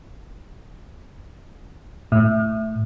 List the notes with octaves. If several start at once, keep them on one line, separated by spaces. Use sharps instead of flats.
A2